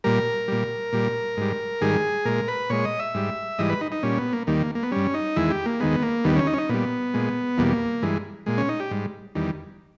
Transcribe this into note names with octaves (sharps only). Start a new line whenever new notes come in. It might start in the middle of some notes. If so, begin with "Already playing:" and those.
A#2 G3 A#4
A#2 G3
A#2 G3
G#2 G3
G#2 D#3 G3 G#4
A#2 G#3 A#4
B4
A#2 G#3 C#5
D#5
E5
G#2 G3
G#2 E3 G3 D#5
B4
D#4
D#4
A#2 G3 C#4
B3
A#3
D#2 D#3 G3 A#3
A#3
B3
G2 G3 C#4
D#4
E2 D#3 G#3 E4
G4
A#3
D#2 D#3 G#3 B3
A#3
D#2 D#3 G3 B3
C#4
D#4
C#4
D#4
A#2 G3 B3
A#2 G#3
E2 B2 G3 A#3
G2 E3 G#3
A#2 G#3
C#4
D#4
G4
G#2 G3
E2 D#3 G3